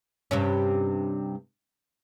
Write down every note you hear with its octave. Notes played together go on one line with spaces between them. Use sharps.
G2 C3 C#4